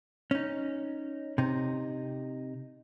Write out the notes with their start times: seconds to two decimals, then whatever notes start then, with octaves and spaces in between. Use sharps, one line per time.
0.31 C#4 D#4
1.38 C3 D#4